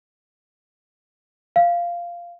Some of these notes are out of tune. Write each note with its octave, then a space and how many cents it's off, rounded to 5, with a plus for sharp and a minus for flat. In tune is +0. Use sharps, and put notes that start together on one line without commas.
F5 -10